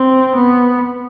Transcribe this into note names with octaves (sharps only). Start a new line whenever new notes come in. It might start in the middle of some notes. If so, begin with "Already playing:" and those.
Already playing: C4
B3